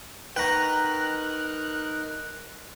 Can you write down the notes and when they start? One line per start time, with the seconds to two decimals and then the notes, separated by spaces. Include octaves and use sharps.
0.36 D#4 A#4 B4 F#5 G5 A#5 C#6 F#6